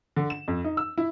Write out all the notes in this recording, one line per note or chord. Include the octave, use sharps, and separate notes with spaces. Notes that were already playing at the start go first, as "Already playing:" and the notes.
D3
E7
F2
D#4
E6
E4